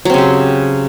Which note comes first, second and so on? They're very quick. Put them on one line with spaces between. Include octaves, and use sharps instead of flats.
F#3 C4 C#3 G4